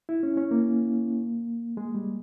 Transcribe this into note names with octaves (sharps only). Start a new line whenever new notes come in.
E4
C#4
C#4
A#3
G#3
G3